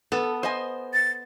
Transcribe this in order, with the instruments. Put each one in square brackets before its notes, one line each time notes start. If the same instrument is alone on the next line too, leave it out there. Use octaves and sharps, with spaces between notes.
[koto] B3 [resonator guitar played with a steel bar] A4
[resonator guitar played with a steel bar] C5 D#5 G#5
[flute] A6